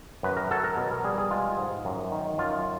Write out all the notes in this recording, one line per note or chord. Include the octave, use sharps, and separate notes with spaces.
F#2 B4
A#4
F#3 A4
A#4
B2
A#4
G3 G#4
G#4
G#3 F4
G#2
F#2
D#3
F#2 F4